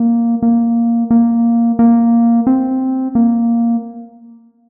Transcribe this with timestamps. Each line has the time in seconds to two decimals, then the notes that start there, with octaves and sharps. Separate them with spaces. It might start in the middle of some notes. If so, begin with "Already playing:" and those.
Already playing: A#3
0.42 A#3
1.11 A#3
1.79 A#3
2.47 C4
3.15 A#3